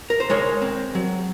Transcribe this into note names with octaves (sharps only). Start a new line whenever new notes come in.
A#4
C5
G#3 A#4 C#5
C4
F#3